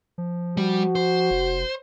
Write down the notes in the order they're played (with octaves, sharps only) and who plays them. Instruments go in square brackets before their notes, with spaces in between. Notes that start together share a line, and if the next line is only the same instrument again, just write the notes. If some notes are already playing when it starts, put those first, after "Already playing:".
[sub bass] F3
[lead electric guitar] G3 [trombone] F#4
[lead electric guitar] C5
[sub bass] F1